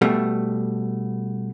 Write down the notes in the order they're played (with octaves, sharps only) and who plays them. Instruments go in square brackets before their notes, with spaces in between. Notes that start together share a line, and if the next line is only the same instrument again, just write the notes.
[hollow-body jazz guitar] B2 G3 A3